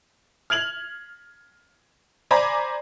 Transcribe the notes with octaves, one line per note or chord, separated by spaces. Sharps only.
F6 G#6 F7 F#7
C5 D5 G#5 A#5 B5 D6